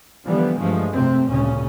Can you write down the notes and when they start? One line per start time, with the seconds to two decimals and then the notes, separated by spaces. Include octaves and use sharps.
0.24 D3 E3 F3 G3 B3
0.58 G2 F3 G#3 A3
0.92 F2 C3 A3 C4
1.25 G#1 D2 A#2 C#3 C#4